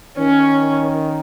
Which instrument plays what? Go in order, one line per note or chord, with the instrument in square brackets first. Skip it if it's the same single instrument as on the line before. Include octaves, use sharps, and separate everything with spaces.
[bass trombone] D#3 [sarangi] C#4